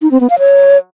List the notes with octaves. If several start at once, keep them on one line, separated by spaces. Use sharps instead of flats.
D#4
C4
B3
F5
C#5